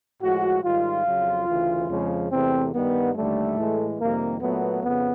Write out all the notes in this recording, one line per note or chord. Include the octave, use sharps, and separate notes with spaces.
A2 F3 G#3 F#4
G#2 D#3 G3 F4
F2 C#3 F#3
D2 C#3 E3
F2 C#3 F3 G#3
E2 C3 E3 A3 C4
G2 D#3 G3 B3
D#2 D3 G3 A3
A2 E3 G#3
F2 C3 D#3 G3 A#3
A#2 F#3 A3 B3
F2 C#3 B3